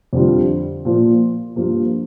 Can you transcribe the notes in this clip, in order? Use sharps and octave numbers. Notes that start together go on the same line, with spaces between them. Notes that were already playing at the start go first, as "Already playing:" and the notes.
F2 D3 G3 D4 F4
A#2 F3 A#3
G2 F3 A#3